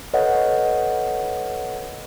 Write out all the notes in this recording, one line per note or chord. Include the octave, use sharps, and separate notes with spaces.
A4 B4 C#5 D#5 F#5